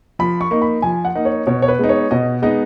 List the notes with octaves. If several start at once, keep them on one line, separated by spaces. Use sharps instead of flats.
F3 B5
C#6
A#3 D#4
B5
F3 G#5
F#5
A#3 D#4
C#5
B2 C#5
C#5
B4
G#3 B3 D#4
C#5
B2 D#5
G#3 B3 D#4 D#5